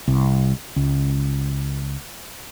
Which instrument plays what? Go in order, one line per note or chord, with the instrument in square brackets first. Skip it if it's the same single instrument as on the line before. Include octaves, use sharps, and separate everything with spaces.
[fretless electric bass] C2
C#2